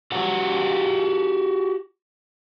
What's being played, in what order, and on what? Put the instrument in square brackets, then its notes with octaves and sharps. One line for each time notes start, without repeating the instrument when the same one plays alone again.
[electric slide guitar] F#4 G4 F#5 A#5